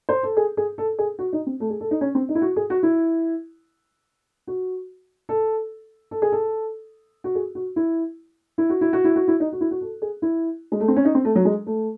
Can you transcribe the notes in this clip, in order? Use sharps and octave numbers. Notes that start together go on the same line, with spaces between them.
C5
A4
G#4
G#4
A4
G#4
F#4
D#4
C4
A3
G#4
A4
D#4
C#4
C4
D#4
E4
F#4
G#4
F#4
E4
F#4
A4
A4
G#4
A4
F#4
G#4
F#4
E4
E4
F#4
E4
F#4
E4
F#4
E4
D#4
F#4
E4
F#4
A4
G#4
E4
G#3
A3
C4
C#4
D#4
C4
A3
F#3
G#3
A3